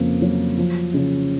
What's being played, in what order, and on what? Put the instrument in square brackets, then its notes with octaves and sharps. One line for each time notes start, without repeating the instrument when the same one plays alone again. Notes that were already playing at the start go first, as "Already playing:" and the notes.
Already playing: [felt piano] F2 C#3 A#3
F#3
F3
C#3